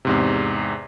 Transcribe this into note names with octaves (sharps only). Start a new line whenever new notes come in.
E2 G#2 C3